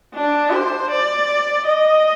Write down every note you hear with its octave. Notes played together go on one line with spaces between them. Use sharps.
D4
C5
D5
D#5